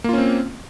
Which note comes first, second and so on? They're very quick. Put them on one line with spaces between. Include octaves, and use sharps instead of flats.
A#3 F4 C#4 C4